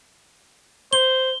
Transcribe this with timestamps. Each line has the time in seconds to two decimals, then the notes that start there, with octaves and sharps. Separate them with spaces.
0.93 C5 G7